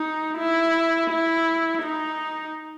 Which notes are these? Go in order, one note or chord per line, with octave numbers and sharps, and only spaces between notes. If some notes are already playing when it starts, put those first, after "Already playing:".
Already playing: D#4
E4
E4
D#4